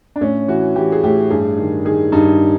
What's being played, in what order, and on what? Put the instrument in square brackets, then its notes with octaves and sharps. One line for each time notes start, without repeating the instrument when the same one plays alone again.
[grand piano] D4
A2 C#4
E3 F#4
E3 G4
G#4
A2 G4
G2 G#4
D#3
D#3 G#4
G2 D#4